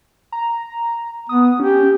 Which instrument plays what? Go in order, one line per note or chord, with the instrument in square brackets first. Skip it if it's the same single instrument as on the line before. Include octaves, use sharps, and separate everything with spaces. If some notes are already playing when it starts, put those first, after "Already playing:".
[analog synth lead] A#5
[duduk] B3 [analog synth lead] D#6
[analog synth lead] C#4 [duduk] G4